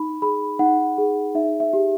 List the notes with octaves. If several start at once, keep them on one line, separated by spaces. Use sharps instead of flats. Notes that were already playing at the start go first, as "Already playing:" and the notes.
Already playing: D#4 B5
G#4 B5
D#4 F#5
G#4
D#4 E5
E5
G4